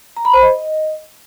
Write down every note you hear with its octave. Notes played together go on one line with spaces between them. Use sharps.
A#5
B5
C5
D#5